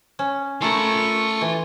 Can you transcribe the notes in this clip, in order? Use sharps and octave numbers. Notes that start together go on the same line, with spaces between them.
C#4
A3 F4 A4 A#4 B5 C#6
E3